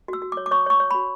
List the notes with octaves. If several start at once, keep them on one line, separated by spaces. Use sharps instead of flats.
F#4
E6
F#4
D6
C#5
D6
C#5 C#6
C#5 C#6
C#5
F#4 B5